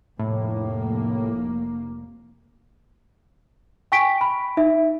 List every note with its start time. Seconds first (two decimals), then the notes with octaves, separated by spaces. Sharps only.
0.19 F1 A2 A#3
3.92 G5 G#5 C#6 B6 D7
4.21 B5
4.57 D#4 E5